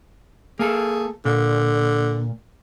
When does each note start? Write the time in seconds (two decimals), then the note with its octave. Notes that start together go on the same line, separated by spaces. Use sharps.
0.59 A#3 G#4 A4
1.25 A#2 D3